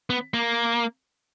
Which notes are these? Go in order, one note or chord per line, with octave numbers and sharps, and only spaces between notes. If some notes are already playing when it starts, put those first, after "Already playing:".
B3
A#3